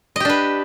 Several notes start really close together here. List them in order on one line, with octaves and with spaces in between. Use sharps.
D#5 G4 D4 B4